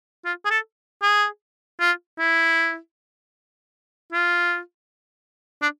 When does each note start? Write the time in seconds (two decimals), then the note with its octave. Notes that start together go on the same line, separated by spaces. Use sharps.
0.25 F4
0.45 G#4
0.51 A4
1.02 G#4
1.80 F4
2.19 E4
4.13 F4
5.62 D4